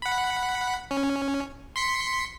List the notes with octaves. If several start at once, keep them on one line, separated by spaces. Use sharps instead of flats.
F#5 B5
C#4
C6 B6 C#7